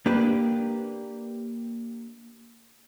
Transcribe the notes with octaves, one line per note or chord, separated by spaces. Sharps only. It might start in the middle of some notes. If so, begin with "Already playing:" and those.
A#3 D4 G4 B4